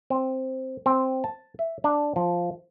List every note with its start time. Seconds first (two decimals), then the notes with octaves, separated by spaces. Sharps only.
0.10 C4
0.86 C4
1.24 A5
1.59 E5
1.84 D4
2.16 F3